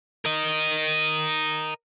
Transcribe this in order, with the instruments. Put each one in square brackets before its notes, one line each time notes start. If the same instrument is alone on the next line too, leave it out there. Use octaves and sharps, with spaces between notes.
[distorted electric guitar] A#4 D#5